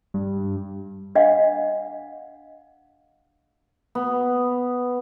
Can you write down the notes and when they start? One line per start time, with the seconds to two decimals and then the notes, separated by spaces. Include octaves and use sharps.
0.14 G2
1.15 D4 D#5 F5 F#5
3.95 B3